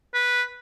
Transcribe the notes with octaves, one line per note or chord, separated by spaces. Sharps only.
B4